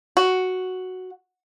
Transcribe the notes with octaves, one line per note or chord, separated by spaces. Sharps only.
F#4